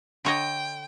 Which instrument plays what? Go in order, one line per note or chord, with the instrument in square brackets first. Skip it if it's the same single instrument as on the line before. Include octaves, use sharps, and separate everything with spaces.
[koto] D3 C#5 D#5 [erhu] G5